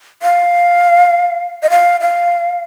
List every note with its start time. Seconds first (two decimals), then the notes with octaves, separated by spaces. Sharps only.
0.22 F5
1.63 D#5
1.70 F5
2.01 F5